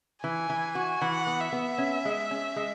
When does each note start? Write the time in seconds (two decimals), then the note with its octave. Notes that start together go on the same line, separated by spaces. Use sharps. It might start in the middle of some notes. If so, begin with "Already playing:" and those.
0.24 E3 G#5
0.50 E3
0.75 F#4
1.01 E3 F#5
1.27 B3
1.40 E5
1.53 B3
1.78 C#4
2.05 G#3
2.31 C#4
2.56 G#3